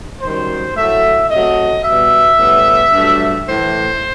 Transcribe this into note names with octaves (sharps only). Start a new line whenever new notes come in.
F#2 D#3 G3 C5
A2 F#3 A3 E5
C3 F#3 A3 D#5
B2 G3 B3 E5
A2 G3 B3
G2 F#3 A3
A2 E3 A3 C5